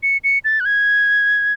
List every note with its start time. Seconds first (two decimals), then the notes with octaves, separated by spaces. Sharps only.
0.03 C#7
0.24 C#7
0.45 A6
0.60 F#6
0.65 G#6